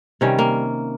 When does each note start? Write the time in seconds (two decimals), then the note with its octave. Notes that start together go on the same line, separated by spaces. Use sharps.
0.21 C3 D#3 G3 C#4
0.39 A#3